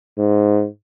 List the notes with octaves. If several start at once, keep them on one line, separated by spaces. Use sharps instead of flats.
G#2